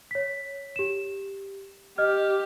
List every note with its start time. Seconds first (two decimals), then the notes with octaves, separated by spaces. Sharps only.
0.11 C#5 B6
0.76 G4 E7
1.98 G4 D#5 F6